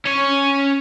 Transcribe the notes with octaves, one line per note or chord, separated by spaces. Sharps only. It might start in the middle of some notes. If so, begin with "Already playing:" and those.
C#4 C#5